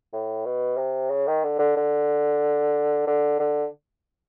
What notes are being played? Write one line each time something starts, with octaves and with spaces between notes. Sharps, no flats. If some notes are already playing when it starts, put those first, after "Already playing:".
A2
B2
C3
C#3
D#3
D3
D3
D3
D3
D3